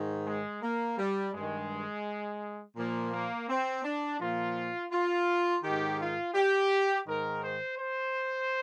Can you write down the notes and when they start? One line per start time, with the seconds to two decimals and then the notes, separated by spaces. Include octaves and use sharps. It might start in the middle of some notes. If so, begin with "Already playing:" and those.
Already playing: G#2 D#3
0.26 G#3
0.62 A#3
0.98 G3
1.33 G2 D#3 G#3
2.76 A#2 F3 A#3
3.12 A#3
3.49 C4
3.84 D4
4.19 A#2 F3 F4
4.92 F4
5.63 G#2 D#3 G4
5.99 F4
6.34 G4
7.07 G#2 D#3 A#4
7.43 C5
7.78 C5